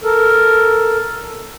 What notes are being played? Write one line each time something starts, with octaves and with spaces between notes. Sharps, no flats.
A4 A#4